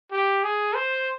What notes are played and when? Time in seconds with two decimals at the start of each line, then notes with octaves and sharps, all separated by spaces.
0.12 G4
0.43 G#4
0.75 C5